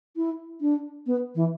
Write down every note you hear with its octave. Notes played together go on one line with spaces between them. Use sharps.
E4
D4
B3
E3